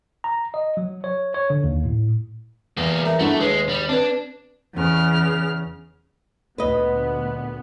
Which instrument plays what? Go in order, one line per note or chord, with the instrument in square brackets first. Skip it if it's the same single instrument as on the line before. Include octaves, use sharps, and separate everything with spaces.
[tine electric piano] A#5
D#5
F#3
C#5
C#5
D3
D#2
A2
[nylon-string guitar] E2 [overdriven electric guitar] G3 A#3
[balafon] A#4 E5 A#5
[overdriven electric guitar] A3 [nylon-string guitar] D4 E4 F#4
[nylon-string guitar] D#2 [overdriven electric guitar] G#3 [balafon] B4
[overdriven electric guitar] G3
[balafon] C4 B4 [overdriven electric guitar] D4
[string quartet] E2 C#3 F6
[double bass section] D2 A#2 B3 [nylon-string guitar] B4 D#5